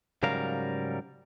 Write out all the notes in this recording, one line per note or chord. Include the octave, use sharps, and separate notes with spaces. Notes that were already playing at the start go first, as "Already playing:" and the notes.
G#2 C#3 F#3 G3 A#4 F5